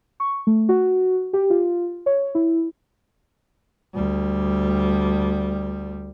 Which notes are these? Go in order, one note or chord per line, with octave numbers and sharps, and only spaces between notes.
C#6
A3
F#4
G4
F4
C#5
E4
D2 G3